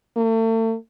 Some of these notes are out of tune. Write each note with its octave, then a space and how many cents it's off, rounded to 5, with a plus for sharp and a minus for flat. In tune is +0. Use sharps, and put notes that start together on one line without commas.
A3 +40